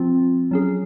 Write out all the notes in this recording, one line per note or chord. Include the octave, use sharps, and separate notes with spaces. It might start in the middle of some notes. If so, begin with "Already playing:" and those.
Already playing: F3 C4 F4
F#3 C#4 G#4